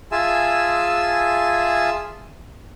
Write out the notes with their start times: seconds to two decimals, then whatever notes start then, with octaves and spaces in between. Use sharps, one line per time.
0.12 F4 G#4 E5 G#5 A5 E6